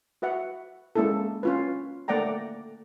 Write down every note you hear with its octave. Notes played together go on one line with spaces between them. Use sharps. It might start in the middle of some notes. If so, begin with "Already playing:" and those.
F#4 B4 E5 F#5
G#3 A#3 C#4 E4 A4
C#4 F4 B4
A3 A#3 D5 F#5 G5 A#5